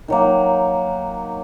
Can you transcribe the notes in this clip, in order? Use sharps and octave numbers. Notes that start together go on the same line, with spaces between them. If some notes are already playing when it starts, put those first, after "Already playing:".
D#3 F#3 A#3